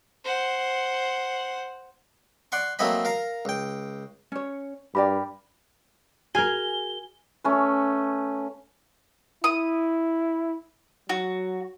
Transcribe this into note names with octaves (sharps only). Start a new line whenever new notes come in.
C5 F#5
D5 F#5 C6 C#6
F#3 A3 A#3 C4 D#5 B5
A#4 F5 A#5
C#2 G5
C#4 C#5
G2 G4 A#4 D5 G5 B5
F#4 G#4 A#4 G#5 F6 G7
A3 C#4 B4
E4 D#6
F#3 F#4